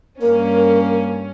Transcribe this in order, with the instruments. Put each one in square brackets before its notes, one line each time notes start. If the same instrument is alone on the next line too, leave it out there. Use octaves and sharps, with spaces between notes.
[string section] G2 C#4 [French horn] A#3 [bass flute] A#4